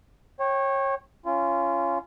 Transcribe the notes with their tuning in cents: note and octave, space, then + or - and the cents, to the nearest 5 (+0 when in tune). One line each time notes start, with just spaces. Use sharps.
C#5 -25 G5 +0
C#4 +0 F4 -25